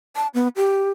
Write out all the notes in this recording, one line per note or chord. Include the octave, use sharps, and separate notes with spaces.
A5
B3
G4